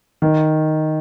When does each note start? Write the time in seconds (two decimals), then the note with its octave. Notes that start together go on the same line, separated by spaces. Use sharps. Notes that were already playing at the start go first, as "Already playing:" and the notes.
0.22 D#3